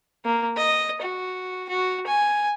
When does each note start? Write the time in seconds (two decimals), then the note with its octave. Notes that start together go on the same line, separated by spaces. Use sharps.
0.25 A#3
0.57 D#5
1.02 F#4
1.69 F#4
2.07 G#5